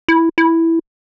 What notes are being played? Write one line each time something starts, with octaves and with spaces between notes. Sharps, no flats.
E4
E4